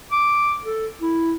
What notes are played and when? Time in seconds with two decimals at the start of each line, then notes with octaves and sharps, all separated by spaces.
0.12 D6
0.65 A4
1.02 E4